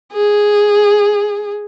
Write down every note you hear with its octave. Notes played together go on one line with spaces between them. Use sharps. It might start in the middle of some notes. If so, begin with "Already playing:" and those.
G#4